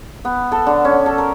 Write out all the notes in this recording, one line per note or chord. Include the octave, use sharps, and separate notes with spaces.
B3
A4
D3
C#4
A4
A#4